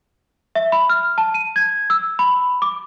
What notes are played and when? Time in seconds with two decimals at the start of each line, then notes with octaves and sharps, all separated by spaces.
0.55 E5
0.72 B5
0.89 F6
1.18 A5
1.34 D#7
1.56 G#6
1.90 E6
2.19 B5
2.62 D6